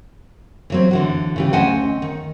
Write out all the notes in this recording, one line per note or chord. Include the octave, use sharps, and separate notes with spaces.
E3 F#3 C4
D3 E3 F#4
C#3 E3 G4
D2 C4 C#4 D#5 F#5 G#5
D#3